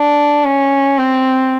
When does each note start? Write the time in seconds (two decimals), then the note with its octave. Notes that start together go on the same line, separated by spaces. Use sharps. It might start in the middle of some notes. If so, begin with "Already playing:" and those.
Already playing: D4
0.44 C#4
0.98 C4